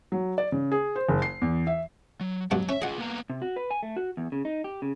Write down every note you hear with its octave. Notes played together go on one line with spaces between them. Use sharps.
F#3
D5
C#3
G#4
C5
F#1
C7
E2
E5
F#3
G2 B2 F#3 F#5
C#4 E5
F4 G#4 D#5 F#5
A#3 B3 A#5
C3
F#4
B4
G#5
A3
F#4
E2
C#3
D#4
G4
C#3